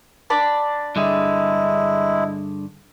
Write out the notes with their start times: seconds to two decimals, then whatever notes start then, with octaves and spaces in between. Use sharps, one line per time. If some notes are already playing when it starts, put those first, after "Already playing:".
0.30 D4 D5 B5
0.96 G2 D3 G#3 E4 G#4